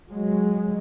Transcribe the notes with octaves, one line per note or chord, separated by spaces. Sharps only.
F#3 G#3